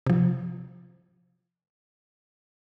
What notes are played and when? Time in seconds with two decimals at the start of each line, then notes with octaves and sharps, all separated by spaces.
0.07 C3 F3